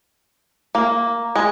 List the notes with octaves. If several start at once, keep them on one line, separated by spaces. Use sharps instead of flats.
A#3
G#3